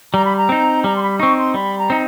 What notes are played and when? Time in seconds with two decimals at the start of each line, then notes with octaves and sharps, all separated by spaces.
0.13 G3 A#5
0.25 B5
0.37 A#5
0.49 C4 D#4
0.84 G3 A#5
0.96 C6
1.02 B5
1.20 C4 D#4 C#6
1.37 C6
1.54 G3 B5
1.79 A#5
1.90 C4 D#4